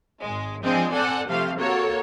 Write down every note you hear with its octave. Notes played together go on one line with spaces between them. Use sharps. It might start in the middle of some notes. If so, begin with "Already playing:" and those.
G#1 G#3
F3 G#3 C4 D4 G#4
C4 A4 D5 F#5 G#5
C3 F3 A3 F5 C6
A#3 F#4 A4 A#4 C#5